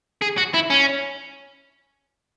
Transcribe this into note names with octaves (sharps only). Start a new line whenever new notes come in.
G#4
F#4
E4
C#4